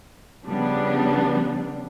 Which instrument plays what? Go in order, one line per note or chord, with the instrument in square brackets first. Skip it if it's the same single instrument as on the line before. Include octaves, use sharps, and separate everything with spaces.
[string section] C#3 F3 G3 B3 D4